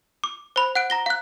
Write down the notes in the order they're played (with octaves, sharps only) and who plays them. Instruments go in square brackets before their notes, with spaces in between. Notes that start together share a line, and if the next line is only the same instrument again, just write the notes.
[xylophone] D6
C5 B5
F#5 F#6 D7
A#5 A#6 G7
F5 F#6